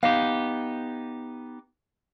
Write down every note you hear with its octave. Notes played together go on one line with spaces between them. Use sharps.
B3 D#4 G4 F5